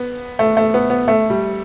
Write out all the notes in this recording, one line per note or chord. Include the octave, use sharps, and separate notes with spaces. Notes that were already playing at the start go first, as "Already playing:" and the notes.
Already playing: B3
A3
A3
B3
B3
A3
G3